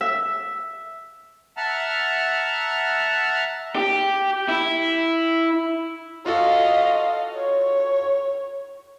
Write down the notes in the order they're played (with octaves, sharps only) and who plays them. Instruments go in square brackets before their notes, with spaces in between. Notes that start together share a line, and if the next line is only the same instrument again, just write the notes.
[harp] E5
[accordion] E5 F#5 A5 A#5 F6
[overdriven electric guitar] G4
E4
[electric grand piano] F4 F#4 A4 [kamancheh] D#5 F5
[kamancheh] C#5